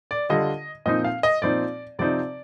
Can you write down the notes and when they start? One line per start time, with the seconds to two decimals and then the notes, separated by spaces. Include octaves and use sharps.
0.11 D5
0.29 D3 G3 D4 F4 D#5
0.86 A#2 F3 C4 D#4 D#5
1.04 F5
1.23 D#5
1.42 A#2 F3 C4 D#4 D5
1.99 C3 F3 C4 D#4 D5